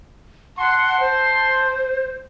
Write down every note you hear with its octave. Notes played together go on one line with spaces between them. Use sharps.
F#5 A5 C6
C5